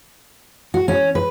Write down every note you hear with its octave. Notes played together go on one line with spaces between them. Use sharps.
F#4
C#4
B4